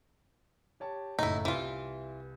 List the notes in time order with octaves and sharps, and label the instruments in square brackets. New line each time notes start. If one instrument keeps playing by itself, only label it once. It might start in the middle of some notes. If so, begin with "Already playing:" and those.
[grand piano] G4 C#5 A5
[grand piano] F#1 A2 [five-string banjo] D#4 E4
[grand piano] C2 [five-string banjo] E3 F4